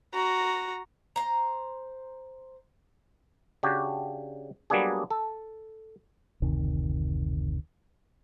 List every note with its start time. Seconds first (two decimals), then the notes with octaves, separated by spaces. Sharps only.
0.14 F#4 A#5
1.16 C5 A#5
3.63 C#3 D4 F#4 G4
4.70 F#3 G3 A#3 B3 D4 G#4
5.11 A4
6.42 F#1 D2 C3 D#3